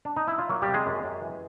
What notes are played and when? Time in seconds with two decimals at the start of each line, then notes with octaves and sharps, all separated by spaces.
0.05 D4
0.16 D#4
0.28 E4
0.38 F4
0.49 F#3 A#3 F#4
0.62 G3 G4
0.68 C3
0.74 G#3 G#4
0.86 F#2
1.04 F#2
1.22 E3